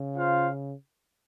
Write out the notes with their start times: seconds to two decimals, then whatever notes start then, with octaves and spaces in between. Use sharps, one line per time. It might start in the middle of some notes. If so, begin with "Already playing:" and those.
Already playing: C#3
0.16 F4 C5 F5